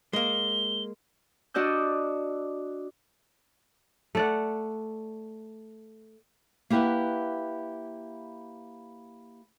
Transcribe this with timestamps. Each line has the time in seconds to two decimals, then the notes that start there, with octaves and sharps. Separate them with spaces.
0.13 G#3 A#3 G7
1.54 D4 F#4 D5 D#5 E6 G6
4.15 A3 D5 F#5
6.70 A#3 E4 G4 B4 E5 F#5